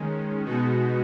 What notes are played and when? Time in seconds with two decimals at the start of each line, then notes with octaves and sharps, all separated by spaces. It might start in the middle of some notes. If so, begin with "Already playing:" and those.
Already playing: D#3 G#3 C#4
0.45 B2 G#3 B3 D#4 F#4